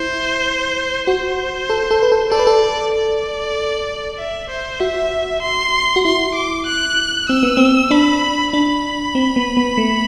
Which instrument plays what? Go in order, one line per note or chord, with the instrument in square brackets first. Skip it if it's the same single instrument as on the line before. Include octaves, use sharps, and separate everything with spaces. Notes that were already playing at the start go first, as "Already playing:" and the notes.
Already playing: [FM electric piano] E4 [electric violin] C5
[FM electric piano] F#4 [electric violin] C5
[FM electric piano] A4
A4
B4
A4
[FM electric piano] A4 [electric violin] D5
[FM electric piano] B4
A4
[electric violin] D5
E5
C5
[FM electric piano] F#4 [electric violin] E5
[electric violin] C6
[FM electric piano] F#4
[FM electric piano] E4 [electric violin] C6
[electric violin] D6
F#6
[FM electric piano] C4 [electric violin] E6
[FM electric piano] B3
C4
[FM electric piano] D4 [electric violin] B5
[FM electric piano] D4 [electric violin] B5
[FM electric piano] C4
B3
B3
A3